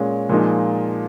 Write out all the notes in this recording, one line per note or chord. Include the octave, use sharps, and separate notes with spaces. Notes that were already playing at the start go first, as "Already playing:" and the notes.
Already playing: A#2 G#3 C#4
A#2 F3 G#3 D#4